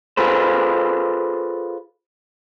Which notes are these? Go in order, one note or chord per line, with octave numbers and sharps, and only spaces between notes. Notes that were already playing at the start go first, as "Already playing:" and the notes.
F4 G#4 A4 B4 C5